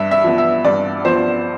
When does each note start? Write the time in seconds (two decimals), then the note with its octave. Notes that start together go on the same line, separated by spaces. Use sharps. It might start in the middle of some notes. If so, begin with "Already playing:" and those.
Already playing: G2 E5
0.11 E5
0.24 F3 B3
0.38 E5
0.65 G2 D5
1.05 F3 B3 C5